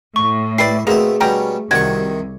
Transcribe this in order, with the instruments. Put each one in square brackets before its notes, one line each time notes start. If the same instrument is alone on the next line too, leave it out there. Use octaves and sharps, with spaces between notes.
[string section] A2 [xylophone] C#6
[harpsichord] E4 E5 [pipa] G4 B4 D5 [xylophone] C7
[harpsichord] B2 C4 E5 [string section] A3 [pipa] A#3 [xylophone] G#4
[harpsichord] B2 G3 C#4 [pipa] G4 G5 A#5
[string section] C2 [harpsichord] C3 D#3 C#6 [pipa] F#4 D5 [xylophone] G#6